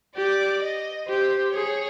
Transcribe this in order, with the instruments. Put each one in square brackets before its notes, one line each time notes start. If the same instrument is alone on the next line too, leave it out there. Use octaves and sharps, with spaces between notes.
[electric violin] G4 [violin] D5
[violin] D#5
[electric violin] G4 [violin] C5
[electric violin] G#4 [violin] C#5